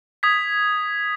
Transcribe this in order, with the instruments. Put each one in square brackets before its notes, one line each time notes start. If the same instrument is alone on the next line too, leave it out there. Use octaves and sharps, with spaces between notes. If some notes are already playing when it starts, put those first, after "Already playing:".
[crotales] D#6 G#6 B6